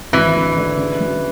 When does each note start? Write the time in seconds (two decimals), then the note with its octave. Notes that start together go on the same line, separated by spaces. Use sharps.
0.13 G#1 E3
0.34 D3
0.57 D3
0.77 C#3
1.00 F#3